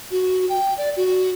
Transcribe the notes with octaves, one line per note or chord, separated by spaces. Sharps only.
F#4
G5
D5
F#4